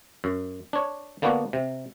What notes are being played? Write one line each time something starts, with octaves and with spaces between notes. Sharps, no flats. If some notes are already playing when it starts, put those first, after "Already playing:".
F#2
D4 C#5
D3 A#3 B3 D4 F#4
C3